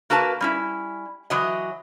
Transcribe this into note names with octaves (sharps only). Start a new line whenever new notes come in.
A#3 F#4 A#4 B4 A5
G3 C#4 E4
E3 F#3 D#5